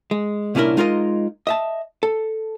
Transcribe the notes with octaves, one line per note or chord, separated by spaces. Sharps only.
G#3
C2 A#2 C#4 D4 E4 A#4
G#3 D#4 F4 A#4 C#5 D#5
D#5 E5 A5
A4